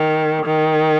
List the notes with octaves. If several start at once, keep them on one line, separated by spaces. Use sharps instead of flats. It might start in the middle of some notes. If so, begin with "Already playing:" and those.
Already playing: D#3
D#3